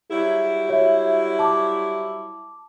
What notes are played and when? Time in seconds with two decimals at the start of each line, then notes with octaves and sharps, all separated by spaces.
0.10 F#3 G3 E4 G#4
0.68 F#4 C#5 E5
1.39 A5 D6